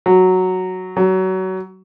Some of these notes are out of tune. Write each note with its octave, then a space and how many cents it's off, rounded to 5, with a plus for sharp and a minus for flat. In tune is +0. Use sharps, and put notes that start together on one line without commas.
F#3 +0
F#3 +25